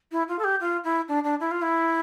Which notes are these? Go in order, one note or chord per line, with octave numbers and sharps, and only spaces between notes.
E4
F4
A4
G4
F4
E4
D4
D4
E4
F4
E4